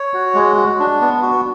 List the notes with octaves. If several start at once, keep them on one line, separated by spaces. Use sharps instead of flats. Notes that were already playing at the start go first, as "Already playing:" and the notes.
Already playing: C#5
F#4
G#3
F#4
D4
B3
F#4